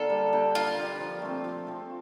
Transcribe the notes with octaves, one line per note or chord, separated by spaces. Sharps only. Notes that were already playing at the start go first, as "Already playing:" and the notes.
Already playing: D3 A#3 F4 A4
G3
A#3 D4 G4
G3 F4
A#3 D4 G4
F3
A3 C4
F3
A3 C4